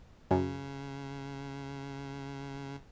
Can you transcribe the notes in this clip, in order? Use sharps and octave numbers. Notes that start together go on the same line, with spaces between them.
F#2 C#3